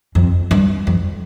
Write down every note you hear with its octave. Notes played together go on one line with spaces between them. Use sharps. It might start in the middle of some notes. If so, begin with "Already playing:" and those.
F2
G2
F2